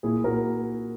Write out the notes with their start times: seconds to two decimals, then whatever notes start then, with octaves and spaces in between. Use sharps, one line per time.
0.03 A#2 E4 G#4
0.24 A#2 F#4 A#4